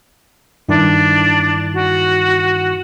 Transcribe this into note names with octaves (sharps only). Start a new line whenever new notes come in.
G2 D#3 D4 E4
F#4